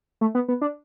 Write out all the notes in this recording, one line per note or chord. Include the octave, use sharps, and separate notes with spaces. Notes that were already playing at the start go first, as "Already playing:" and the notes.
A3
B3
B3
D4